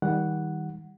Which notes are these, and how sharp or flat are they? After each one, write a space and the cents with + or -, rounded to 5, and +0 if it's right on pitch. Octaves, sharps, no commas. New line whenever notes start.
D#3 +30 G3 +0 F#5 +0